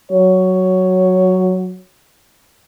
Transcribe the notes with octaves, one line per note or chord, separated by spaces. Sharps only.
F#3 C#5